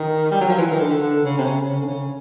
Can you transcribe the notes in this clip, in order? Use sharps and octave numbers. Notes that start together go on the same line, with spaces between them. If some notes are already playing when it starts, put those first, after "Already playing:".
Already playing: D#3
G3
F#3
F3
E3
D#3
D3
D3
C#3
C3
C#3
C#3
D3
C#3